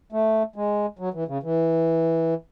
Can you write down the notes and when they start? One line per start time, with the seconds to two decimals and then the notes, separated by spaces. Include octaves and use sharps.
0.12 A3
0.56 G#3
0.99 F#3
1.14 E3
1.28 C#3
1.43 E3